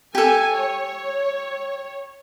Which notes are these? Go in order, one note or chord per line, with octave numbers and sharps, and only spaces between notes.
G4 A4 G#5
C#5